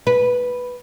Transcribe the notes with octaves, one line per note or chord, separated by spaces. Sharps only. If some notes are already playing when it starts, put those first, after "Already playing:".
B4